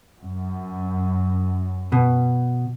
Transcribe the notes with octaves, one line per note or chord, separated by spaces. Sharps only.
F#2
B2